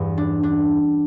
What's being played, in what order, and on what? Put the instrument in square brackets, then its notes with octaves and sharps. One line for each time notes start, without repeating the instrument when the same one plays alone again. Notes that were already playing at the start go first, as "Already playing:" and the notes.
Already playing: [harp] E2 G2
D4
D4